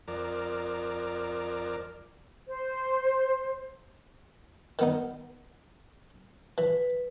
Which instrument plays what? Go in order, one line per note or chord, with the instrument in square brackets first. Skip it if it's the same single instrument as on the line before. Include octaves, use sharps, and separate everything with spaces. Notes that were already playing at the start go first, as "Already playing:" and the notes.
[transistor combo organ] F2 A#4 D5
[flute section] C5
[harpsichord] D#3 B3 D#4
[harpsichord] E3 [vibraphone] B4